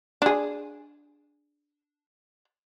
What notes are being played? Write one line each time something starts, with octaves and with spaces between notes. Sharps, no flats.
D4 G#4